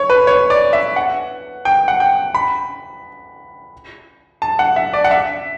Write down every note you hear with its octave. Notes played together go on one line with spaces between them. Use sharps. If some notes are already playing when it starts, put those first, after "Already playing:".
Already playing: C#5
B4
C#5
D5
E5
F#5
G5
F#5
G5
B5
A5
F#5
E5
D5
F#5
E5